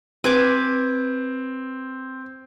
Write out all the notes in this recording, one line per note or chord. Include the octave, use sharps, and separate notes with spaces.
C4 B4 G#5 D6